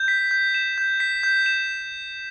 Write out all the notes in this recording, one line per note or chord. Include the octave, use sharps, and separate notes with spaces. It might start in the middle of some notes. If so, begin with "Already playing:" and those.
Already playing: G6
B6
G6
E7
G6
B6
G6
E7